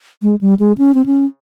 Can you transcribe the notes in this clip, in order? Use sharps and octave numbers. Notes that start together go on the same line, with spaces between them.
G#3
G3
G#3
C#4
C4
C#4